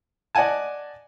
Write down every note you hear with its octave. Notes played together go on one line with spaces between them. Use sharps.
D5 D#5 F#5 G#5 A5